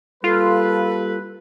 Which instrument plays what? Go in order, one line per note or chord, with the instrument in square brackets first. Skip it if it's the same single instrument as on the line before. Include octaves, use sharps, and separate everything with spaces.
[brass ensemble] G3 A#3 B4 [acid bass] F4 [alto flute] A4